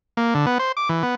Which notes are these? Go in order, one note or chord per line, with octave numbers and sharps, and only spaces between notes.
A#3
D3
B3
C5
D6
E3
B3